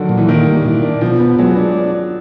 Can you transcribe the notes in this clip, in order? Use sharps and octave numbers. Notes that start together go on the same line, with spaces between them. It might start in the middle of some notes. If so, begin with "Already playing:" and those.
Already playing: D3 D#3 F#3
A#2
E3
D#3 A#3
G3
A#2 E3
D4
B2 F3
B3
F#3 G#3
D4